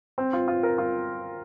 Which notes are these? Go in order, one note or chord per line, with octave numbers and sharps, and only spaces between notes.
C4
F4
F4
A#4
F4